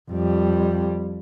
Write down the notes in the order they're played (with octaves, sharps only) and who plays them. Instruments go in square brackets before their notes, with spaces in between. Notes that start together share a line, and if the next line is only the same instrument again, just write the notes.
[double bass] F2 G3